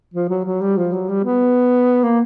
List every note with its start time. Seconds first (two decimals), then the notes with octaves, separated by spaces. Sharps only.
0.14 F3
0.29 F#3
0.45 F#3
0.61 G3
0.77 F3
0.93 F#3
1.09 G3
1.24 B3
2.04 A#3